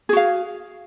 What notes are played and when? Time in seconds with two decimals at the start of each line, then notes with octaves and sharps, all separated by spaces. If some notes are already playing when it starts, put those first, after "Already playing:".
0.09 G#4
0.13 F#4
0.17 F5